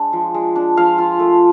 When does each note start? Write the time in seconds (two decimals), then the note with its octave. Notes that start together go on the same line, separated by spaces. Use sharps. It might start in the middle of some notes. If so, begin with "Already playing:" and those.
Already playing: G#3 D4
0.13 F3
0.34 G#3
0.56 D4
0.77 F3 F5
0.98 F4
1.19 A3